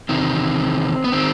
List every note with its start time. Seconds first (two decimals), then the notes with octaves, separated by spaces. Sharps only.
0.09 E2 C3 D#3 C4
1.04 B3
1.12 D#3 C4